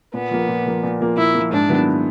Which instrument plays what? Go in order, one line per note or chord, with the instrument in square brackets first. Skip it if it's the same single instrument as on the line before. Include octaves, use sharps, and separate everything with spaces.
[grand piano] A#2 [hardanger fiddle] B3
[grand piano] F3 A#3
A#2
F3 A#3
A#2
F3 A#3
[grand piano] A#2 [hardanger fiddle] E4
[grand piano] F3 A#3
[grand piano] G#2 [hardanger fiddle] D4
[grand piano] D#3 F#3 B3 E4